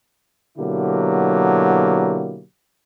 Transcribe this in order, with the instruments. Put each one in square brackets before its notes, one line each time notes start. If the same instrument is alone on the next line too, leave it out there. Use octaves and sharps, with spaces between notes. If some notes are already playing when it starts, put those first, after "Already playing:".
[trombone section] B2 D3 F#3 A#3 E4 G4